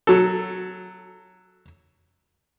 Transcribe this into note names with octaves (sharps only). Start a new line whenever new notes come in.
F#3 A4